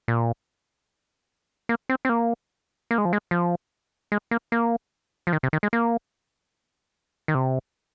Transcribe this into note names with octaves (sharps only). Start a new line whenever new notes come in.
A#2
A#3
C4
C4
A#3
A#3
G#3
F3
G#3
F3
G#3
A#3
A#3
F3
D#3
C3
D#3
G#3
A#3
D#3
C3